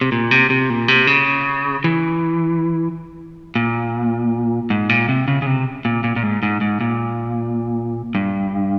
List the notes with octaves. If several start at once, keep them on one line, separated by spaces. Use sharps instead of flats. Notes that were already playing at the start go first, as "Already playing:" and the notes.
C3
A#2
C3
C3
A#2
C3
C#3
E3
A#2
G#2
A#2
C3
C#3
C#3
C3
A#2
A#2
A#2
G#2
G#2
G#2
A#2
G2